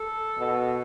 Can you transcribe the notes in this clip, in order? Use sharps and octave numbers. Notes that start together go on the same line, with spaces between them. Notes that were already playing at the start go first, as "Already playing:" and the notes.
Already playing: A4
B2